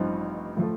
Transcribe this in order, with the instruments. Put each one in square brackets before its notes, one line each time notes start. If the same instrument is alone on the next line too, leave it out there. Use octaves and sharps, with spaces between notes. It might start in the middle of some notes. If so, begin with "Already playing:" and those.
Already playing: [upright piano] A1 G2 F3 C4 D#4
A2 F3 A3